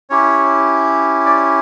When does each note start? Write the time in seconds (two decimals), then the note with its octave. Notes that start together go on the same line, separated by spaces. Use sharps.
0.10 C#4 E4 G4 C#5
1.26 D5